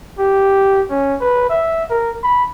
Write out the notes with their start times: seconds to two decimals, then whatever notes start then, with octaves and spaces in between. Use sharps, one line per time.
0.19 G4
0.90 C#4
1.21 B4
1.50 E5
1.90 A#4
2.23 B5